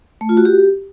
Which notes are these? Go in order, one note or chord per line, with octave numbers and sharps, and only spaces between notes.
A3
F4
F#4
G4